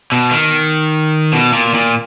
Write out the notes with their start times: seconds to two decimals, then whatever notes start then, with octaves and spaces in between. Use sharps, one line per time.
0.12 B2
0.31 D#3
1.33 B2
1.53 A#2
1.74 A#2